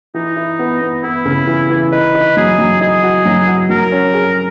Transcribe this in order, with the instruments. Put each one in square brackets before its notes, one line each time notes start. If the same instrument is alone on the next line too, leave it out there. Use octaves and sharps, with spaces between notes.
[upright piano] E3 [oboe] D#4
[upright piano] E4
B3
B3
[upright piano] B3 [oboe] E4
[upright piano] C#3
E3
E3
[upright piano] D#4 [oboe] B4
[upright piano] D#4
[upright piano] F#3 [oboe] G#4
[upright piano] F#3
[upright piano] D#4 [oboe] G#4
[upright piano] F#4
F#3
F#4
[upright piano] F#3 [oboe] A#4
[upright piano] C#4
G#4